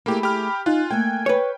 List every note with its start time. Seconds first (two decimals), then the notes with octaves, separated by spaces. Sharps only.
0.06 A3 A#3 E4 G4 G#4 B5
0.23 G4 F6
0.66 D#4 F4 G#5 F#6
0.91 A3 A#3 G5 G#5 G#6
1.26 B4 C#5